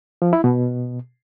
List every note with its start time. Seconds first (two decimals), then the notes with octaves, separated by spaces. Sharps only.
0.22 F3
0.33 E4
0.44 B2